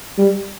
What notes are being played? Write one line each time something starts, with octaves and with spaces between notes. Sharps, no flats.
G3